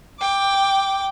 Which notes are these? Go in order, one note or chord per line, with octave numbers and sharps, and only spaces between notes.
G5 D6